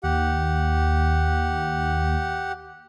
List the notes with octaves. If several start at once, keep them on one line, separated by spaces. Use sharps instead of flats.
D#2 G4 F#5